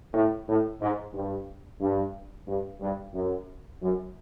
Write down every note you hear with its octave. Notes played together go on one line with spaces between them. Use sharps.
A2
A2
G#2
G2
G2
G2
G2
F#2
F#2